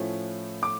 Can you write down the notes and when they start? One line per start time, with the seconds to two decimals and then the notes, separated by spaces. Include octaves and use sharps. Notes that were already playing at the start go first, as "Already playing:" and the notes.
Already playing: A2 F3 A3 C#4
0.63 D6